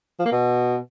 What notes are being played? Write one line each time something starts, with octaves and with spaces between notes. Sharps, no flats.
F3
A#3
B2